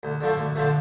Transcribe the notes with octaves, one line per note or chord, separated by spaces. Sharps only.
D2
D3 F3 A3
D2
D3 F3 A3